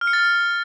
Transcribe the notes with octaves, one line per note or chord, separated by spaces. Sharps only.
F6
C#7
A6
F6